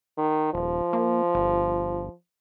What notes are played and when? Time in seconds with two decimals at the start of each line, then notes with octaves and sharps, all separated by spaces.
0.18 D#3
0.54 D#1 F3
0.93 A#3
1.35 G1